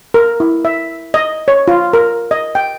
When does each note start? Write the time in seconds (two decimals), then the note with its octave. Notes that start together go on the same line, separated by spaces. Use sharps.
0.14 A#4
0.40 E4
0.65 E5
1.14 D#5
1.48 C#5
1.68 F4
1.93 A#4
2.31 D#5
2.55 G5